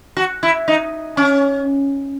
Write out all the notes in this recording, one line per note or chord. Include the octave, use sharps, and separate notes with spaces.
F#4
E4
D#4
C#4